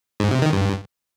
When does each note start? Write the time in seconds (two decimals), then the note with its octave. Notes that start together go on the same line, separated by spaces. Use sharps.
0.20 G#2
0.31 C3
0.42 D#3
0.53 G2